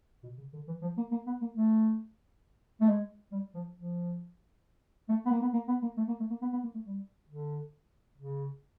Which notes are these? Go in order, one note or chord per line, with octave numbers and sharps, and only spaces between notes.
B2
C#3
D3
E3
F3
A#3
A#3
B3
A#3
A3
A3
G#3
G3
F3
F3
A3
B3
A#3
B3
A#3
B3
A#3
A3
A#3
A3
A#3
B3
B3
A#3
A3
G3
D3
C#3